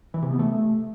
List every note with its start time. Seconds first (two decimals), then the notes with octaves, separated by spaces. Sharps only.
0.14 E3
0.22 C3
0.31 B3
0.39 A3